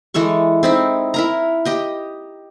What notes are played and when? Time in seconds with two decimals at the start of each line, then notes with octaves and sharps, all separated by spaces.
0.14 E3 G#3 A4 C#6
0.63 C4 D#4 E4
1.14 E4 A#4 A#5
1.65 G4 D#5 G5